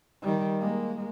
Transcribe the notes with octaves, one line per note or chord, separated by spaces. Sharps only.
D#3 G3
G#3 A#3